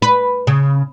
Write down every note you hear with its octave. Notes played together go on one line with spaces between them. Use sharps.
B4
C#3